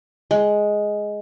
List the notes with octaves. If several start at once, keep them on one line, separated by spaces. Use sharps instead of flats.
G#3